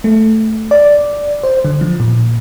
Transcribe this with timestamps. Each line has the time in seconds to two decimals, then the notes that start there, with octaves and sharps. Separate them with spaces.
0.04 A3
0.71 D5
1.44 C5
1.65 D3
1.81 F3
2.00 A#2